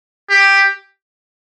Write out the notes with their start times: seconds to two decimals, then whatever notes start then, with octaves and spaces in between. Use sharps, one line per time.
0.30 G4